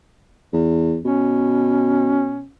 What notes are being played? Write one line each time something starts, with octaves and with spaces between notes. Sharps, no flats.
E2
B2 C#4